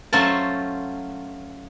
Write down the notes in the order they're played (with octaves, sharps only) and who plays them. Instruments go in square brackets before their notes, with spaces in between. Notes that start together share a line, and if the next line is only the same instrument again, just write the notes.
[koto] F#3 A3 C#4 F4 C5 A5